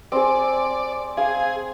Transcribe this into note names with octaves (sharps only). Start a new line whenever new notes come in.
C4 G#4 D5
G#4 F5